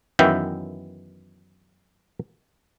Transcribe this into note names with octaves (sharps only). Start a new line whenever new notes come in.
F#2 D#3 E3 B3 E5 G5